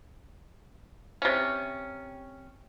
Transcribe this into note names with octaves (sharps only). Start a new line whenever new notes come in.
C3 C#4